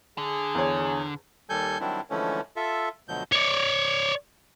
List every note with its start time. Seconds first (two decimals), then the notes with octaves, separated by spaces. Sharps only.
0.18 D3 G#4
0.55 E2 C#5
1.49 D#2 G3 A4 G#5 G6
1.80 D#3 F#3 G3 C4 D4 E4
2.10 D3 E3 F3 G#3 A3 C#4
2.56 F4 A4 E5
3.08 D2 B2 F3 F#3 G6
3.32 C#5 D5